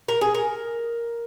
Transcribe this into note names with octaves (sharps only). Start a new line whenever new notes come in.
A#4
G#4
A#4